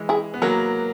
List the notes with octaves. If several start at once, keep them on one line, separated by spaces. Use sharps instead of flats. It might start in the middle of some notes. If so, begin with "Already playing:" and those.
Already playing: E3 G#3
E4 G#4
B3
F#3 A#3 F#4 A#4